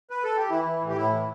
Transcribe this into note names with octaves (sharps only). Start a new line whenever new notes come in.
B4
A4
G4
E3 E4
E3
A2
G4
A2 E4
E3